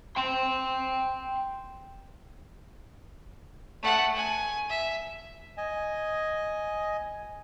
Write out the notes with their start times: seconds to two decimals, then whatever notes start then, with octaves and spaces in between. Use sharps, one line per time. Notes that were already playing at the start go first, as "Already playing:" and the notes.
0.16 G5 C6
3.83 A3 F#5
4.16 G#5
4.70 E5
5.57 D#5 G#5